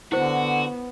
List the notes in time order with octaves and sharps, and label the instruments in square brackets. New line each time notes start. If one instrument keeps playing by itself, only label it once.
[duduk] D3 [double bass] B3 [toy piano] E4 C5 [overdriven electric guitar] F#4